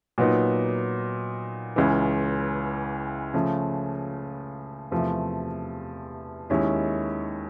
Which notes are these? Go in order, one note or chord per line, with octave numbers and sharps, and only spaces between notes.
A#2 F#3 B3 D#4
C#2 C#3 E3
C#3 F3 A3
E2 C3 F3 A3
D#2 D#3 G#3 C#4 E4